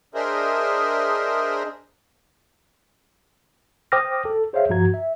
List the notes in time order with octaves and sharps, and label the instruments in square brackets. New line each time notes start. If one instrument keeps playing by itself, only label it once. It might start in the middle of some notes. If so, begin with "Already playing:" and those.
[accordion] D4 G#4 A#4 C5 D#5 E5
[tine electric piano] C5 G5 D6 D#6 F6 A#6
A4
G#4 C5 C#5 E5 F5
G2 F3 F#4 A#5 G#6
E5